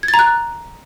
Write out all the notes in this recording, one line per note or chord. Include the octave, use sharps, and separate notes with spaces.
G#6
A6
A#5
F#6